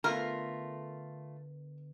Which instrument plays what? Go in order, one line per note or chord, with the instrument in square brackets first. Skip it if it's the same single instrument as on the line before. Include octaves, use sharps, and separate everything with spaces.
[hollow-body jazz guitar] D3 B3 [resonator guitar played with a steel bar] A3 F4 [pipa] A#4